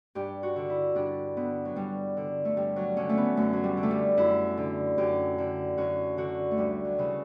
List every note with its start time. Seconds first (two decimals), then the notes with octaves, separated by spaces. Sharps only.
0.15 G2 G4
0.43 F#4
0.56 D3
0.70 E4
0.96 G2 D4
1.37 D3 B3
1.65 F#3
1.76 G2 G3
2.17 D3
2.45 A3
2.57 G2 G3
2.76 F#3
2.97 D3 C#4
3.09 A3
3.17 B3
3.37 F#2 A3
3.53 F#3
3.64 G3
3.77 D3
3.83 A3
3.91 G3
4.17 F#2 E4
4.57 D3
4.98 F#2 G4
5.38 D3
5.77 F#2 F#4
6.17 D3 F#4
6.51 A3
6.57 D2 G3
6.85 F#3
6.98 C#3 E3